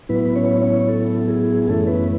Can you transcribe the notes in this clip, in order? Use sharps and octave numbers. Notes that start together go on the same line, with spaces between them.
A2 F#3 B3 E4 B4
C#4 C#5
C#4 C#5
A4
G#4
F#2 E3 A3 C#4 E4 A4
B3 B4